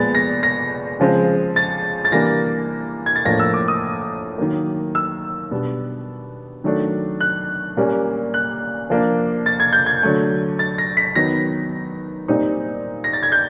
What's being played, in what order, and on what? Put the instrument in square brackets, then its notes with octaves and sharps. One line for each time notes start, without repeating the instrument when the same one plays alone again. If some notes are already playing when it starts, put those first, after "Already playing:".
Already playing: [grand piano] A#2 F3 G#3 B3 A6
A#6
A#6
C#3 F3 G#3 C4
A6
A6
E3 G3 A#3 D4 A#6
G#6
A6
A2 F3 A#3 D4 A#6
E6
D6
D#6
D#3 F#3 A#3
E6
B2 G3 B3 D4
D#3 F#3 A3 D4
F#6
A#2 G3 A#3 C#4
F#6
F3 A#3 D4
A6
G#6
G6
G#6
D3 F#3 A3
A6
A#6
B6
D#3 F#3 B3 D#4 A#6
A#2 G3 C4 D#4
A#6
A6
G#6
G6